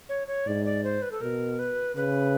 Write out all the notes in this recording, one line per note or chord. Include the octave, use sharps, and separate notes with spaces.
C#5
C#5
G#2 D5
D5
C5
B4
A4
B2 A#4
B4
C#3 B4